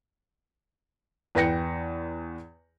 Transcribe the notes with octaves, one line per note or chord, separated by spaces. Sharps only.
E2 B4 G5 A#6 C#7